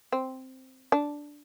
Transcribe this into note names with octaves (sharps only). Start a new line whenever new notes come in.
C4
D4